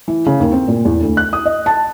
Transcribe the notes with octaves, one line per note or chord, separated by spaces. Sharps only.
E3
C#3
D#2
C4
A#2
E2
D2
F#6
D#6
D#5
A5